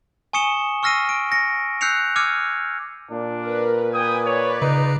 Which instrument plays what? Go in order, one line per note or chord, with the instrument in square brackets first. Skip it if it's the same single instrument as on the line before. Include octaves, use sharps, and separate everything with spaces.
[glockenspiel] G#5 C#6 D#6 C#7 E7 G7
C#6 E6 F6 A#6 C7 D#7
D7
A#6 C#7
E6 F#6 G6 C7 C#7 F7
D6 E6 F6 G#6 C#7 D#7
[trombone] A#2 [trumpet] D4
[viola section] A#4 B4
[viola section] B4 G5 G#5 [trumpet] D#6
[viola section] B4 D5 [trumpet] C#5
[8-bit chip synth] C#3 [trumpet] D#4